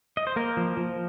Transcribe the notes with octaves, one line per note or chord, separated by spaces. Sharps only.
D#5
C5
A#3 A#4
F3
F3